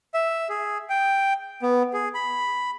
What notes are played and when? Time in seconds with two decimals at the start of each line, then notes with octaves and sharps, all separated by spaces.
0.14 E5
0.50 G#4
0.90 G5
1.62 B3
1.93 G#4
2.14 B5